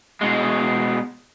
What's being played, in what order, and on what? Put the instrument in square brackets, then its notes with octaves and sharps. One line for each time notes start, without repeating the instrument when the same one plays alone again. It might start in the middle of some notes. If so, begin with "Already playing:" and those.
[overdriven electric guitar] B2 G#3